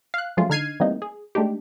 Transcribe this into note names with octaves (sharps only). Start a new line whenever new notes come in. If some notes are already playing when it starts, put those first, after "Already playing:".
F5 F#6
F3 F#3 G#3 A3 C#4 F4
D3 D#4 F6 G#6 C7 D#7
E3 G3 A3 A#3 C4 D#4
G#4
G#3 A3 D4 D#4 G4